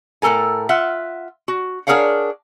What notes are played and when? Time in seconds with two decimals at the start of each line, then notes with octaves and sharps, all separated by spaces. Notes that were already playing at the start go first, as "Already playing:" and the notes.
0.22 A2 C4 A4 A#4 G#5
0.69 F4 E5 F#5
1.48 F#4
1.87 D4 G#4 A#4 C#5 F5 F#5